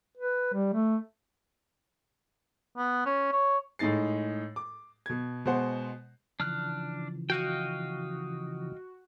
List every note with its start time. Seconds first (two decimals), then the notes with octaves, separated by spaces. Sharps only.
0.17 B4
0.53 G3
0.74 A3
2.77 B3
3.06 C#4
3.33 C#5
3.79 A2 G#3 D#4 A6 C7
4.56 D6
5.06 B2 G#6
5.45 B2 G#3 C5 F#5
6.40 C#3 E3 F3 D4 F6 F#6
7.30 F#4 D#5 F5 G5